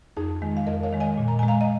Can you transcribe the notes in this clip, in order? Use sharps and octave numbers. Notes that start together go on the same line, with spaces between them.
F2 D#4 G#4
D#3 G#3
F5
F2 A#4 D#5
C#5 F5
D#3 G#3
D#5 G#5
A#2
A#5
G#3 G#5
F5 A#5
D#5